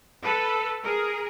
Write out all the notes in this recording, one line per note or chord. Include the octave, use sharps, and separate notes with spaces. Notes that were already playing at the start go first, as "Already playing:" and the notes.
A4 B4
G#4 A#4